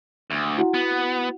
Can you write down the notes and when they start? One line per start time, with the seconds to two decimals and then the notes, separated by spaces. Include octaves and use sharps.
0.30 D2
0.57 E4 F#4 F#5
0.74 B3